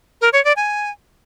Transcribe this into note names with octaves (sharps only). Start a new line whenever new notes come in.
A#4
C#5
D5
G#5